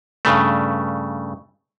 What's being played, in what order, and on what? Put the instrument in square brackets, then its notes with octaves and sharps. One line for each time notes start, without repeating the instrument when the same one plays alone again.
[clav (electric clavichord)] G2 C#3 A3